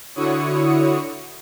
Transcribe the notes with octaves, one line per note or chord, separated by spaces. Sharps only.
D3 E4 F#4 C#5 D#6 C#7